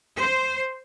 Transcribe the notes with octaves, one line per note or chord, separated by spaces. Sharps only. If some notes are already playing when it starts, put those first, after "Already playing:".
C5